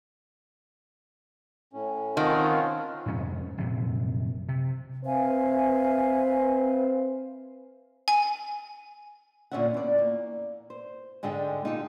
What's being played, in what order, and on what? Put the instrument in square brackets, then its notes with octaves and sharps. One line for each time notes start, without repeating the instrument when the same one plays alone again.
[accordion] A2 C#4
[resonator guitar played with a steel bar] D#3 [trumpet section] C4 C#4 F4 [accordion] F#5 A5
[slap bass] F2 G#2 C3 C#4
A#1 F#2 C3
C3
[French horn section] C4 B4 C5 [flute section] E5 F5 G#5
[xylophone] G#5
[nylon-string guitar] D2 A#2 D3 C#4 E5 F#5
E2 D5
A#3
C5
G#2 D3 G#3 G#4 G5
D#4 F4 G4 A4